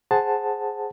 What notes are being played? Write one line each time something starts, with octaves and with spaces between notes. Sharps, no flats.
G#4 C5 F#5 A5